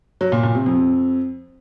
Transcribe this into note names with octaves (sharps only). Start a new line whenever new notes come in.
F#3
A#2
A#2
C3
F2